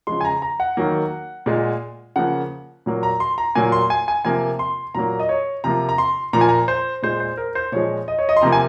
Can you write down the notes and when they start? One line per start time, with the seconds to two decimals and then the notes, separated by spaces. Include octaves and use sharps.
0.07 C#3 F3 G#3 C6
0.21 G#5
0.25 A#5
0.42 A#5
0.60 F#5
0.77 D#3 F#3 A#3
1.46 A#2 G#3
2.16 C#3 F3 A#3 F#5
2.86 A#2 F#3 A#3
3.03 A#5
3.20 C6
3.38 A#5
3.55 A#2 F#3 A#3 G#5
3.72 C6
3.90 G#5
4.08 G#5
4.25 C3 F3 A#3 G#5
4.59 C6
4.95 A#2 F#3 A#3 A#5
5.19 D#5
5.29 C#5
5.64 C3 F3 A#3 A#5
5.89 A#5
5.98 C6
6.33 A#2 F3 A#3 A#5
6.41 G#5
6.49 A#5
6.68 C5
7.03 A#2 G#3 C5
7.20 C5
7.37 A#4
7.55 C5
7.72 A#2 F3 G#3 C#5
8.08 D#5
8.19 C#5
8.29 D#5
8.37 C6
8.41 C3 F3 A#3 A#5
8.52 G#5